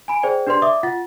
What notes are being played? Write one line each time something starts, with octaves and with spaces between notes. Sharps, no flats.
G#5 B5 D7
G#4 C5 D5 G5
D4 G4 B4 D5 C6
D5 E5 D6 D#6
F4 F#5 A6